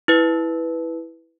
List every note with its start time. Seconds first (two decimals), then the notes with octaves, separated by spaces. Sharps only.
0.08 E4 B4